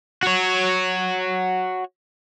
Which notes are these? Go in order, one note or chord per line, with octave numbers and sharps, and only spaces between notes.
F#4 C#5